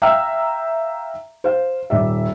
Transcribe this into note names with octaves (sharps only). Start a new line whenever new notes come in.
E5 F5 G5 A#5 E6 F6
C5 F5
D#1 D5 E5